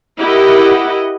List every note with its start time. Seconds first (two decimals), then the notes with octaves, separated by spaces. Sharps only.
0.19 E4 G4 A#4 D#5 F#5